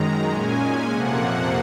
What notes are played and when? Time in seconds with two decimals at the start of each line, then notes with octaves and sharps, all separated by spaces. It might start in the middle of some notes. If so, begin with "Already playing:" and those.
Already playing: F#2 D#3 G#3 A#5
0.29 A#2 G#3 C#4 G#5
0.90 F2 C3 F3 A#3 F#5